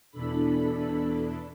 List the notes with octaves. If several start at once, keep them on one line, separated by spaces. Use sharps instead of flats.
E2 B2 E3 D4 A4 B5